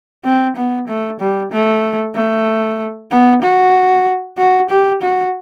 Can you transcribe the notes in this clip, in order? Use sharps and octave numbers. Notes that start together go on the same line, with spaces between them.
C4
B3
A3
G3
A3
A3
B3
F#4
F#4
G4
F#4